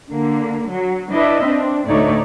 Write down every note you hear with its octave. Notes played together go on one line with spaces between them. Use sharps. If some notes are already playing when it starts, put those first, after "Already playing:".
D3 A#3
F#3
D4 E4 B4 D#5 E5
C4 D4
D2 A2 A3 D#4 C#5 D5